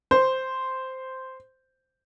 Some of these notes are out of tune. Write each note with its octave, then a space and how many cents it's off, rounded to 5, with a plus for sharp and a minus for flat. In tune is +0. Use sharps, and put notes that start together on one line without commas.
C5 -5